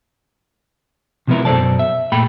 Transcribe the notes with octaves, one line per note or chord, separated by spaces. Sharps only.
C3 F3 G#3 B3 E4 A#4
F#2 B2 A4 C5 D5 A5
E5
A#2 A3 G#4 G5 B5